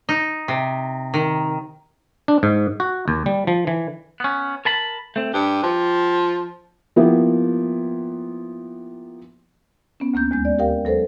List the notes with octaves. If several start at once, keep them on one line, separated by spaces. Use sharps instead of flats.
D#4
C3
D#3
D4
G#2
F#4
D#2
G3
F3
E3
B3 C#4
A#4 A5 B5
A3 C4
G2 G4
F3
F3 A#3 B3 E4 G4
B3 C#4
D2 A#3 C#4 G6
D#2 G#3 G6
D5
G4 A#4 F5 G5
F#3 A4 B4 C5